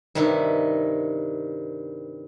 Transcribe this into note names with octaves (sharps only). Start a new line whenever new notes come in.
G2 C3 D#3 E4